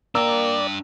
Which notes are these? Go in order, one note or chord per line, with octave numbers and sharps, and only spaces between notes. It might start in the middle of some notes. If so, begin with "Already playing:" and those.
A#3 D4 D5 G5 A#5 E6